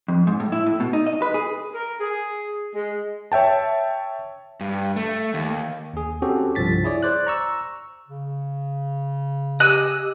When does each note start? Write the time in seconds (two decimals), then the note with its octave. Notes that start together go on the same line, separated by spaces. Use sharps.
0.08 F2
0.27 G#2
0.40 A2
0.52 E4
0.66 A2
0.80 B2
0.93 D#4
1.07 D#5
1.22 B4
1.34 G#4
1.75 A#4
2.00 G#4
2.76 G#3
3.32 C#5 E5 G5 A5
4.61 G2
4.96 A3
5.34 D#2
5.93 D#2 G#4
6.22 C4 C#4 F#4 G4 A4
6.55 C2 G2 F3 A6 B6
6.84 E4 G#4 C#5 D5
7.03 C5 D5 F#6
7.27 A#5 C#6 E6
8.08 C#3
9.60 G4 D#5 G#5 E6 F#6